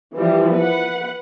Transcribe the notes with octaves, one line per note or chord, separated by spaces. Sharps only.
E3 F3 G3
B4 F#5